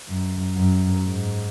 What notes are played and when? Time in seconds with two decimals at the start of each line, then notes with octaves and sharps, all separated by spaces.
0.09 F#2
0.57 F#2
1.05 G#2